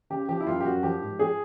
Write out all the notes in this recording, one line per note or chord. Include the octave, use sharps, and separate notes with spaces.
C#3 G4
F3 G4
E4
F#2 F4
G4
F#2 F#4
F3 G4
G#2
F3 G#4